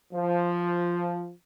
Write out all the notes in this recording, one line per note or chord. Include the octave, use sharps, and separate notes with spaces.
F3